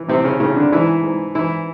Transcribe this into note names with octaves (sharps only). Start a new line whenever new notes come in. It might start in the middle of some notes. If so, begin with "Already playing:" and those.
Already playing: E3
A2 C3 C4
C#3 C#4
A2 C#3 C#4
D3 D4
G#2 E3 E4
G#2
G#2 E3 E4